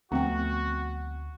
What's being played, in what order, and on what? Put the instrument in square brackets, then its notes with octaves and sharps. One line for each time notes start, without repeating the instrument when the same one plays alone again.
[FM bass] D2 [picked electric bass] F3 A3 B3 [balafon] C4 G5 [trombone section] F#4